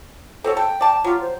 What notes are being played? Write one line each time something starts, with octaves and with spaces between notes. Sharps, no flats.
C4 F#4 A4 C#5
A4 G5
D5 A5
F#3 F4 G4
C5